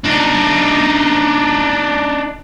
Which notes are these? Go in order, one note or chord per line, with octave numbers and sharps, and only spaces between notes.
D4 D#4